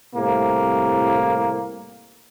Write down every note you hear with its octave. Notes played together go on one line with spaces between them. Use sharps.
C2 A2 C3 A#3